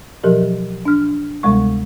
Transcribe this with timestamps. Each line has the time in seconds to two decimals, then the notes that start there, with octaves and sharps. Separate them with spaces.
0.24 B2 F3 F#3 G4 A#4
0.85 D4 F6
1.43 D2 C3 G3 G#3 C#6